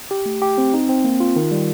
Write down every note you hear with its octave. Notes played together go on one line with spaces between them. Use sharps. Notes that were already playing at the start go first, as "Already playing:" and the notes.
G4
A3
G4
C4
D#4
C4
A#3
F4
D#3
G3